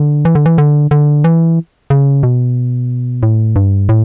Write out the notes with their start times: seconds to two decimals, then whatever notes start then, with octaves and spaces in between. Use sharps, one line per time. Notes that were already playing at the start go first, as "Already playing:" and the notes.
Already playing: D3
0.25 E3
0.35 D3
0.46 E3
0.58 D3
0.91 D3
1.24 E3
1.90 C#3
2.23 B2
3.23 A2
3.56 G2
3.89 A2